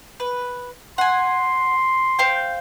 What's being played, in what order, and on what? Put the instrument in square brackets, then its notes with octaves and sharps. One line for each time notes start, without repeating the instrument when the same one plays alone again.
[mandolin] B4
[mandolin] F#5 G#5 [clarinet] C6
[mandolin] C5 F5 G5